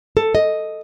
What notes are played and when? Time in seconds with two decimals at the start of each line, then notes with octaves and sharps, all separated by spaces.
0.17 A4
0.35 D#5